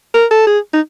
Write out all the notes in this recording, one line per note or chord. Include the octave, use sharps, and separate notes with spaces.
A#4
A4
G#4
D#4